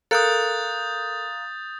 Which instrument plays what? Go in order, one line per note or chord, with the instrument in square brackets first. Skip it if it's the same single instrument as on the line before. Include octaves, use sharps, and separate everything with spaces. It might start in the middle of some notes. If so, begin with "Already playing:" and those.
[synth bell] A4 A#4 [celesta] F5 A#5 F#6 [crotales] D#6 G6 A6